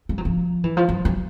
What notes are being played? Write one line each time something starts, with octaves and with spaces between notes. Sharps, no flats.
G3
F#3
F3
E3
F3
F#3
F#3